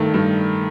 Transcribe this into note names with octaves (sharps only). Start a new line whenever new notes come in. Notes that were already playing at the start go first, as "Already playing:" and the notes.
Already playing: G2 D#3 A3
G2